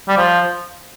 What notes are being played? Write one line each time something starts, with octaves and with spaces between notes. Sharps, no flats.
G3
F3